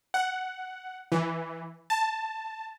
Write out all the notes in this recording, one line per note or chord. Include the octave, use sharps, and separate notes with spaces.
F#5
E3
A5